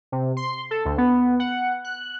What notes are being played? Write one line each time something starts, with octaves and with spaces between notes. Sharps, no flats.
C3
C6
A4
D2
B3
F#5
F#6